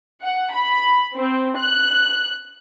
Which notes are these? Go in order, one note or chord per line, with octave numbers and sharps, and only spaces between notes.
F#5
B5
C4
F#6